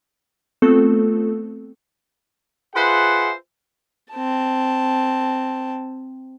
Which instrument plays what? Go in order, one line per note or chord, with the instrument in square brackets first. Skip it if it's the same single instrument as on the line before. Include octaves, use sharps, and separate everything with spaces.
[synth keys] A3 B3 C4 F4 A4
[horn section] F4 G#4 B4 C5 E5 F#5
[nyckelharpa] C4 A5